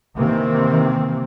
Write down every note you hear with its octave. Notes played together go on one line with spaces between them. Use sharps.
C3 D#3 E3 A#3 C4